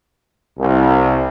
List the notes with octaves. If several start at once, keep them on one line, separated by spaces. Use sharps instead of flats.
C2